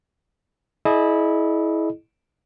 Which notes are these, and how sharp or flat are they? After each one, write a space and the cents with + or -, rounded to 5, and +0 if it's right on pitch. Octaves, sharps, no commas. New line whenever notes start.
E4 -15 G#4 +40 D#5 -30